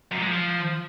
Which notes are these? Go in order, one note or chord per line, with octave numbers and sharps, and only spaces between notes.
F#2
A#2
G#3
F3